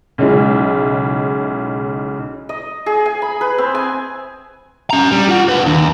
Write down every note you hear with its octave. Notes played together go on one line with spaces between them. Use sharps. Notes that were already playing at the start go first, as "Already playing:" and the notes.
B1 C#3 G#3 E4
D#5
G#4
G#5
B5
B4
C4
G#5
C#4 A#5
G3
F4 F#5
D4 B4
D#2